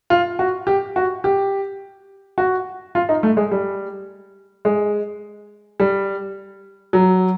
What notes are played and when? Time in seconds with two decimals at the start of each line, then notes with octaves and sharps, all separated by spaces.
0.10 F4
0.39 F#4
0.67 G4
0.96 F#4
1.24 G4
2.38 F#4
2.95 F4
3.09 D#4
3.23 A3
3.37 G#3
3.52 G3
4.65 G#3
5.80 G3
6.93 F#3